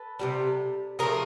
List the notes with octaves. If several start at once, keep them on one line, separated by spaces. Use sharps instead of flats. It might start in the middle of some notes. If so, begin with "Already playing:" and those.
Already playing: A4 B4
C3 E3 G3
C3 F3 A3 G#4 A#4